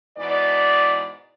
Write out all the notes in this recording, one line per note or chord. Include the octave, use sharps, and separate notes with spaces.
G#2 B2 E3 D5